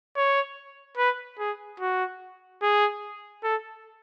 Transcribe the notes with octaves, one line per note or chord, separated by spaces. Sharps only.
C#5
B4
G#4
F#4
G#4
A4